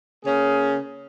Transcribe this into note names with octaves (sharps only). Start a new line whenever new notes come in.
C#3 A#3 C#4 G#4